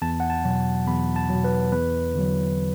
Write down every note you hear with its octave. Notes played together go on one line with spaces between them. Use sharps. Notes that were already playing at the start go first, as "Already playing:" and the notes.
E2 A5
F#5
A5
B2 F#3
E2 B5
A5
B2 F#3
B4
E2 B4
D3 F#3